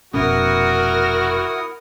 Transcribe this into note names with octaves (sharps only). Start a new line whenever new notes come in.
F1 B2 C#4 E4 F#4 A#4 F#5 D#6